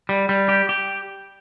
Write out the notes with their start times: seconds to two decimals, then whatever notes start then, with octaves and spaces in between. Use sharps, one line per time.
0.09 G3
0.29 G3
0.49 G4
0.69 G4